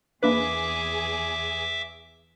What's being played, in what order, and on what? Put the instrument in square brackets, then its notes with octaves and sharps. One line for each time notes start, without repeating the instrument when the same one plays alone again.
[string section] E2 G#4 [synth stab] A#3 D4 B4 [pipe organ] E5 D6